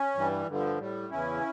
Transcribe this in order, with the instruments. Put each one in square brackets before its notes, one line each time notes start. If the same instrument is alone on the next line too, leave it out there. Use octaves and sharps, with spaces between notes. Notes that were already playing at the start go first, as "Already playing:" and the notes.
Already playing: [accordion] C#4
G2 E3 G3
G2 D3 F3
A2 G3
E2 C#3 E3 C#4 E4